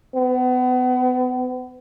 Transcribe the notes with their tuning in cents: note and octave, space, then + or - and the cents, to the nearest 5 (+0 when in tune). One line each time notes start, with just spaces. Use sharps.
B3 +35